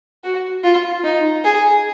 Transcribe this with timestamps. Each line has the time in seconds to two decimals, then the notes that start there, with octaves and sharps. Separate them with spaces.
0.24 F#4
0.64 F4
1.04 D#4
1.44 G#4